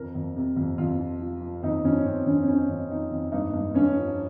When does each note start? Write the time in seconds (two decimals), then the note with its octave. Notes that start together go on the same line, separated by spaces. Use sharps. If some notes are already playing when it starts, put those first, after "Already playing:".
Already playing: F2 A#4
0.15 F2
0.36 C3
0.56 F2
0.78 F2 F4
0.99 F3
1.21 F3
1.42 F3
1.63 F2 D#4
1.84 F2 C#4
2.06 F2 C4
2.27 F2 C#4
2.48 F2 C#4
2.69 F2
2.90 F2 D#4
3.11 F2
3.32 G2 D#4
3.54 G2
3.74 G2 C#4
3.97 F3